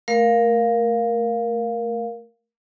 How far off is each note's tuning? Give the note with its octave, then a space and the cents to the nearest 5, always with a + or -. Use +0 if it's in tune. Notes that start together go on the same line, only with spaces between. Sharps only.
A3 +0 A#4 +10 F5 +0